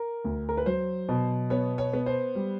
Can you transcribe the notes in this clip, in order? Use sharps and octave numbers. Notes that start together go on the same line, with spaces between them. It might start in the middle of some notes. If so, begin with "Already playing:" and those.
Already playing: A#4
D2
A#4
B4
F#3 C5
B2
B3 C#5
C#5
B3
C5
G3